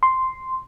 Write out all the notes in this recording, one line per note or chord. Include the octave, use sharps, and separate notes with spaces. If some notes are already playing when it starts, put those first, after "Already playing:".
C6